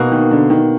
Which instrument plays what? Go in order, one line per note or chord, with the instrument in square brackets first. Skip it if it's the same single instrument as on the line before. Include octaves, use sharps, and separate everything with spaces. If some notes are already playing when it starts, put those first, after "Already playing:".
Already playing: [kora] B2 A#3 D#4 F#4
[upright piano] D#3
D3
D#3